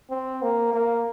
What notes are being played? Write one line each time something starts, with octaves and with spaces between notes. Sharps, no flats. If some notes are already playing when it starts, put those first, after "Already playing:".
C4
A#3
A#3